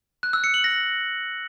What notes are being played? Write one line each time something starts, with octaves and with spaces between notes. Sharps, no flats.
F#6
E6
C#7
F#7
A#6